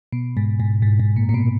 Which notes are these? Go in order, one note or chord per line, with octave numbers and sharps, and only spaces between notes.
B2
G#2
G#2
G#2
G#2
A#2
A#2
B2